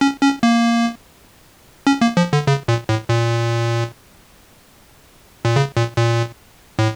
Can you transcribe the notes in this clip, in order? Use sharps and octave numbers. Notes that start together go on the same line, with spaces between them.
C#4
C#4
A#3
C#4
A#3
F3
D3
C#3
A#2
A2
A#2
A#2
C#3
A#2
A#2
A2